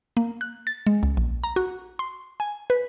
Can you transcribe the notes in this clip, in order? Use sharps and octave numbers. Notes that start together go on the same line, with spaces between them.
A#3
F#6
A6
G#3
C#2
A#1
A#5
F#4
C6
G#5
B4